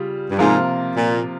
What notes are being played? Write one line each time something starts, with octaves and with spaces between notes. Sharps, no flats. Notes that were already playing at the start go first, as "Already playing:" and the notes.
Already playing: C#3 G3 F4
G2
G#2 C3 F3 A#3 F4 A#4
A#2